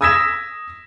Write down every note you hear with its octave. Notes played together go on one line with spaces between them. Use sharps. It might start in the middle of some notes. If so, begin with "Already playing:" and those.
D#6 E6 G#6 A#6 B6 E7